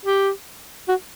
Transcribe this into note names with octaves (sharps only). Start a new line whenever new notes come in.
G4
F#4